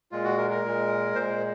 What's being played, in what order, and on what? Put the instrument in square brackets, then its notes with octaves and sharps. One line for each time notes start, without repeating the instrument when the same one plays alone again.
[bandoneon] A#2 G#3 F4
F#4
A#4
A#4
A#2 G#3
A#2 G#3 C5